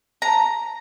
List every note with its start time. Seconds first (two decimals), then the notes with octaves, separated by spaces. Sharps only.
0.22 A#5